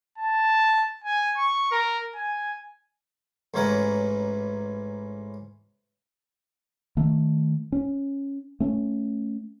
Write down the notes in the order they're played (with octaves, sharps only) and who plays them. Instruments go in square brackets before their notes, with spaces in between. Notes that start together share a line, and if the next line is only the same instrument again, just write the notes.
[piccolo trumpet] A5
G#5
C#6
A#4
G#5
[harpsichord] A1 G#2 E3 C#4 A#4 F#5
[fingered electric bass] D#3 A3
C#4
A3 C#4